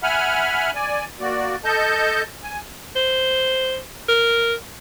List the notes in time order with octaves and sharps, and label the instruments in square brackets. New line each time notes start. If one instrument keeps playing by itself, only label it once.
[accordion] E5 F#5 G#5 B5 F6
D5 G#5
A#3 F#4 D5
A4 D#5 A5 G6
G#5
[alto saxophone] C5
A#4